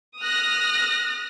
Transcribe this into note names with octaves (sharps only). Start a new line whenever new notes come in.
D#6 F6 F#6 A#6